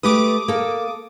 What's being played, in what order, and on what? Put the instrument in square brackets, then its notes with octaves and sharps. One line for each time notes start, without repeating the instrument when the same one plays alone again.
[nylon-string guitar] A3 G4 B4 [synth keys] D6 D#6
[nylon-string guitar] A#3 A4